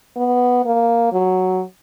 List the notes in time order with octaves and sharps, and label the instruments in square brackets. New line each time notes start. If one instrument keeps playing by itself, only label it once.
[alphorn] B3
A#3
F#3